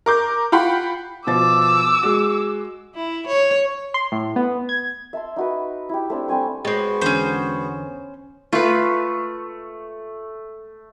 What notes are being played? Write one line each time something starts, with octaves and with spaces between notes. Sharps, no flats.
A#4 D6 G6
F4 F#5 G5 B5
B2 F3 D6 E6 A6
G#3 F#4
E4
C#5
C6
A2
B3
G#6
E5 A5 C6
D#4 F#4 B4
E4 G4
A3 C4 D4
G3 C4 G#5 C#6
G#3 B3 C4 F#4
E2 D3 C#4 C5
A3 F4 B4